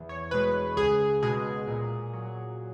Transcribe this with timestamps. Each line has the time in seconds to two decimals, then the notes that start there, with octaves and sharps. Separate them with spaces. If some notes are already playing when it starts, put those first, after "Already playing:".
Already playing: E2
0.09 C#5
0.31 B2 G#3 B4
0.77 C#2 G#4
1.23 B2 G#3 G#4
1.68 A#2
2.13 F#3